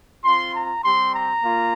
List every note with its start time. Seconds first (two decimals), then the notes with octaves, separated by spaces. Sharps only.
0.24 C4 F4 C6
0.54 A#5
0.84 G3 C4 G4 C6
1.13 A#5
1.42 A#3 F4